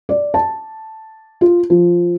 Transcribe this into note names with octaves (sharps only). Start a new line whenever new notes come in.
D5
A5
F4
F3